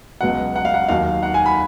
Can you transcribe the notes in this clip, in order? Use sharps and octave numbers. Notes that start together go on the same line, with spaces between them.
C#2 B2 F#3 F#5
F#5
F5
F#5
D#2 D#3 F#3 F5
F#5
G#5
B5